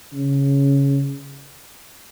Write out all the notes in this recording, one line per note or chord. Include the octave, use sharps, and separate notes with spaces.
C#3